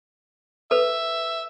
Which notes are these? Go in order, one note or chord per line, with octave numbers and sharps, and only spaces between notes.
A4 B4 E5